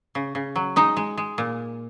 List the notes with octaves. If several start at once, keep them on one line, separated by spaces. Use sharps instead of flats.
C#3
C#3
F#3
G#3 D#4
G#3
G#3
A#2